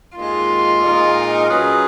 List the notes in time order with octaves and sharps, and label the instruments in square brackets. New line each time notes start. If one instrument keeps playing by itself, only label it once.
[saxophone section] D#2 D#3 G#3 [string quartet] F4
[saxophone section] A#2 G#3 D#4 A#4
F#3 C#4 G#4 B4